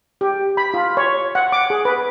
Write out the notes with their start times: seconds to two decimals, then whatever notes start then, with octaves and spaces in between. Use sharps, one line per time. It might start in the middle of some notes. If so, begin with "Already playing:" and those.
0.21 G4
0.57 B5
0.74 F4
0.97 C#5
1.35 F#5
1.52 D6
1.70 G#4
1.85 B4